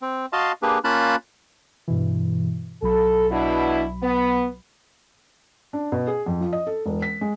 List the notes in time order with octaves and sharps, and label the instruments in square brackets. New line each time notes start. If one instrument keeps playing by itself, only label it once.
[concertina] C4
F#4 D#5 F5 A5 C6
A#3 D4 G4 G#4 B4
A#3 C#4 F4 A5 B5 F#6
[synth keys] G2 B2 E3
[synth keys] B1 F#3 B5 [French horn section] A4
[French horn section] B2 D4 E4
B3
[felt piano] D4
B2
G#4
F2
F3
D#5
A4
E1
B6
G#3